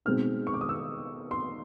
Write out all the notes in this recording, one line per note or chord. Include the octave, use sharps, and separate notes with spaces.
B2 G#3 C4 D#4 F6
C#6
D6
D#6
E6
C6